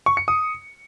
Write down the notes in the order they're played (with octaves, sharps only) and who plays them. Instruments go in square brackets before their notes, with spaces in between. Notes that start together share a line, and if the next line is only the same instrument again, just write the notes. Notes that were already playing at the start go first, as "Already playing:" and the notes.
[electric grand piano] C#6
C#7
D#6